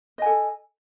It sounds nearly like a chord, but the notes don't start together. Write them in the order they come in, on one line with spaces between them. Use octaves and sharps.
D#5 G#5 A4